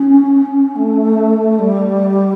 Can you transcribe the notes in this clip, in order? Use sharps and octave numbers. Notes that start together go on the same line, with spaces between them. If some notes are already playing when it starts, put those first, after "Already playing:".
Already playing: C#4
A3
G3